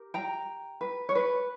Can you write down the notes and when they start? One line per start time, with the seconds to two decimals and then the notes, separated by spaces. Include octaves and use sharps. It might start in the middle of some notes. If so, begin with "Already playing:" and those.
Already playing: G4 A#4
0.14 G5 A#5
0.81 B4
1.09 C#5
1.15 B4